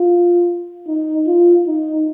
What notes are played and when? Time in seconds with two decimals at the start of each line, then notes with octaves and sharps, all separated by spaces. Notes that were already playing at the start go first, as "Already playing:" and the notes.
Already playing: F4
0.87 D#4
1.27 F4
1.67 D#4